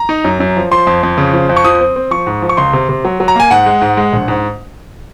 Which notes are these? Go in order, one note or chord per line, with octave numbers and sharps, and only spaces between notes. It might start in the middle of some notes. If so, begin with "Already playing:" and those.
Already playing: A#5
D#4
F#2
F#2
F3
F3 C6
F2
F2
C#3
F3
F2
C#6
F3 D#6
C4
C4
F3 C#6
G#2
F3
C#6
C#2 C6
C3
C3
F#3
F#3
A#5
A#3 G#5
G#2 F#5
G#3
G#2
G#3
A#1
G#2